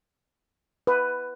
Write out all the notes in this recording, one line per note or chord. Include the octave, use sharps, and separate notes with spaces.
B4